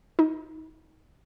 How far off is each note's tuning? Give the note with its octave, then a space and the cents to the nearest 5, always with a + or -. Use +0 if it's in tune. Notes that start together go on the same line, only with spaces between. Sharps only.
D#4 +25